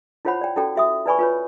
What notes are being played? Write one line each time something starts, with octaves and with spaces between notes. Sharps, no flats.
E4 F4 C5 C#5 F#5 B5
D5 G5
C#4 E4 F#4 A4 D5 G5
F#4 E5 D#6
E4 B4 D5 G#5 B5 C#6
F4 B4 C#5